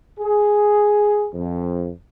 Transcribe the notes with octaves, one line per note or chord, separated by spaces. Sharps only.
G#4
F2